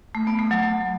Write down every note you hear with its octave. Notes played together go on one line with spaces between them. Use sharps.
A3
B3
A3
F#3